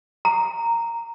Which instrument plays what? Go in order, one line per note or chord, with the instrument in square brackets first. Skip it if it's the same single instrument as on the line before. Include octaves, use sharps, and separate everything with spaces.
[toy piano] A#5